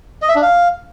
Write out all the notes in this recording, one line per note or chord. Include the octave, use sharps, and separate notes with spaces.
D#5
E5
D4
F5